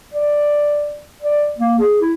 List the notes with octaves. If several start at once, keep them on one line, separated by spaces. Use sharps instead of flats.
D5
D5
A#3
G#4
E4